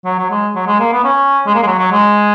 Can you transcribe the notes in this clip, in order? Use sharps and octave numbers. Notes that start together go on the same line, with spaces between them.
F#3
F#3
G#3
F#3
G#3
A#3
B3
C#4
G#3
A#3
G#3
F#3
F#3
G#3